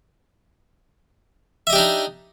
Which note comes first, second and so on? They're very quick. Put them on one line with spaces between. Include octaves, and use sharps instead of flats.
E5 D#5 G4 D4 D#4